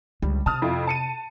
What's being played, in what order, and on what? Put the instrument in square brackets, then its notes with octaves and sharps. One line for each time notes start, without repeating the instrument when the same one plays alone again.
[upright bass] C#2 D3 [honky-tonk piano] G3
[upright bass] C3 [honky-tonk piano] A5 D#6 F6
[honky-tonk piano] F2 E4 F4
A5 C#7 D#7